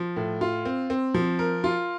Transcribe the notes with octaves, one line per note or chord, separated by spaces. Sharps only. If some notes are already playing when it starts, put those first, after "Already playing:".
Already playing: F3
A2
F4
C4
C4
F3
A#4
F4